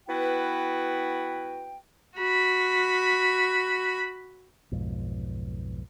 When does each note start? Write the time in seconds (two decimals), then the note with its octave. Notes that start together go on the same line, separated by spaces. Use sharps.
0.08 B3 E4 F#4 B4 G5
2.17 F#4 B5
4.71 B1 F2 G#2